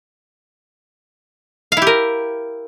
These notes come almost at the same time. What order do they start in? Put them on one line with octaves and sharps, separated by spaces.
F5 E4 G4 A#4